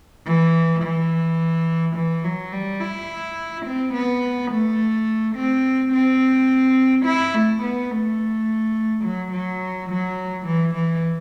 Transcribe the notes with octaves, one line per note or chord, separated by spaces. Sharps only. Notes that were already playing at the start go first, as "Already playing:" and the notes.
E3
E3
E3
F#3
G3
E4
C4
B3
A3
C4
C4
E4
A3
B3
A3
F#3
F#3
F#3
E3
E3